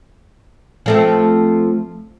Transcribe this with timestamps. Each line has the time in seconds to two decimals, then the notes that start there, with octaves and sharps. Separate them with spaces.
0.86 F3 A3 C4